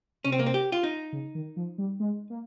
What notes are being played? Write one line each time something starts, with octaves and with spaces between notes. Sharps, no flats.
C3 C#4
C4
A#3
C4
G4
F4
D#4
C#3
D#3
F3
G3
G#3
A#3